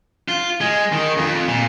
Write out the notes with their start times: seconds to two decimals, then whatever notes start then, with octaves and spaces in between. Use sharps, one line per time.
0.28 F4
0.61 G#3
0.92 D#3
1.18 F2
1.48 A#2